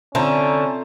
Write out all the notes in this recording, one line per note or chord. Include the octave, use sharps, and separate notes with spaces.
D3 C4 C#4 F4 C5 E5 A5 A#5